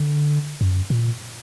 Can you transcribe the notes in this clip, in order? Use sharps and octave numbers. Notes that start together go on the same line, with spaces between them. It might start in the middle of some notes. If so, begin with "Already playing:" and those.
Already playing: D3
F#2
A#2